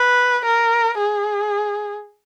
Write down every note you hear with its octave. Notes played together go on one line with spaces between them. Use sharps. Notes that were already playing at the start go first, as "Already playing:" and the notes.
Already playing: B4
A#4
G#4